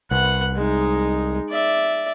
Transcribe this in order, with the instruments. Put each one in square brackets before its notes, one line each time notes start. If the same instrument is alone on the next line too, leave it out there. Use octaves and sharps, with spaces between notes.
[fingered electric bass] C2 [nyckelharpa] B4 F#5
[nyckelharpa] G#3 D#4
D5 E5